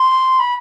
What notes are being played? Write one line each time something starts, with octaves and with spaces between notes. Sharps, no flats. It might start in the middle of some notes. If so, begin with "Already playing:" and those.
Already playing: C6
B5